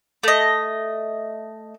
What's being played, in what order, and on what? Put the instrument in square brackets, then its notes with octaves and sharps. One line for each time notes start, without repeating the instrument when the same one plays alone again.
[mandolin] A3 D#5